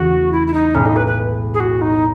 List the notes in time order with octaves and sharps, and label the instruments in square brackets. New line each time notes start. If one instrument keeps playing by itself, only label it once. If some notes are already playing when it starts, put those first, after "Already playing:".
Already playing: [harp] E2 C#3 E3 A3 [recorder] F#4
[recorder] E4
E4
D#4
[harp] B1 A2 G#3 [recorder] C#4
[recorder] D#4
B4
B4
G#4
F#4
D#4